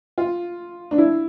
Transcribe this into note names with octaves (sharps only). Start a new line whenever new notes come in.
F4
D4
E4